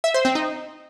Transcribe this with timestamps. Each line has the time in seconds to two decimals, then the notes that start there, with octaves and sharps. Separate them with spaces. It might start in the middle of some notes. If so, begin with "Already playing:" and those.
0.04 E5
0.14 C5
0.25 C4
0.35 D#4